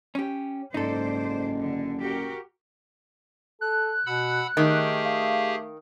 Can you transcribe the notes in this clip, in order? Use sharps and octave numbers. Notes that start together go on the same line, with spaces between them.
C#4 G4
F#1 G#2 D#4 A4 C5 D5
D3
F#4 G4 A#4
A4 F#6
B2 F#5 B5 E6
D#3 A3 G4 G#4
F5